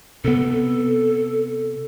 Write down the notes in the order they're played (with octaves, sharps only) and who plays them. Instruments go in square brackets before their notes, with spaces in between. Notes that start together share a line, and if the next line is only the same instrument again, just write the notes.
[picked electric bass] C3 B3 [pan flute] A4